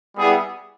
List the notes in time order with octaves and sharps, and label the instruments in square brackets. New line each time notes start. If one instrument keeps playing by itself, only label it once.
[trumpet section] G3 B3 E4 G#4